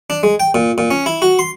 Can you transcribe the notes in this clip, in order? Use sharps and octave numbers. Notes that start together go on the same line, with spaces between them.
D4
G#3
G5
A#2
A#2
C#4
E4
F#4
C6